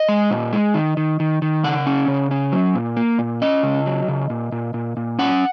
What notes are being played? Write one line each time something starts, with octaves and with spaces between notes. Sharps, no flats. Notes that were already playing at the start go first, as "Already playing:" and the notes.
Already playing: D#5
G#3
A#2
G#3
D#3
D#3
D#3
D#3
C#3 F#5
C#4
C#3
C#4
F#3
A#2
A#3
A#2
C#4 D#5
C#3
F#3
C#3
A#2
A#2
A#2
A#2
C#4 F#5